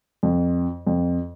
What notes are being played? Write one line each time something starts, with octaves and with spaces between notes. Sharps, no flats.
F2
F2